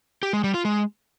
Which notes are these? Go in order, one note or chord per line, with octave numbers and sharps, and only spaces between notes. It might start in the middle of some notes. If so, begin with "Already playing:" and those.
G4
G#3
G3
F4
G#3